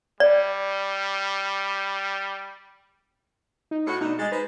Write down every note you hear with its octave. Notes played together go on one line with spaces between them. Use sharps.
G3 D5
D#4
A2 F#4 C#7
B2 A3 D4 D#4
G#3 A6
D#4 B4 C5